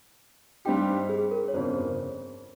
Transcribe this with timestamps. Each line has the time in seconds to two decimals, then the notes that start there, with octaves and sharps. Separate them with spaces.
0.65 G2 G3 C4 D#4 G4 G5
1.09 G#4
1.31 A#4
1.48 C#5
1.53 G1 F2 C#3 C5